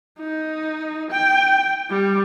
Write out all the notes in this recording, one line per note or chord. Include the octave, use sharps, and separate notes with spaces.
D#4
G5
G3